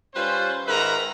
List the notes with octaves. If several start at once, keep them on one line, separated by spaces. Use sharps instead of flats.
G3 C#4 F4 B4 C5
G#2 D#3 A#4 B4 E5 A#5